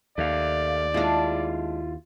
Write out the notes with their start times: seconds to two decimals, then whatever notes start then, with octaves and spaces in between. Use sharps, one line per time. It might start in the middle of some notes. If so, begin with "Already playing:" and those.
0.18 D#2 A3 D5 F5
0.94 G#3 D4 E4 F4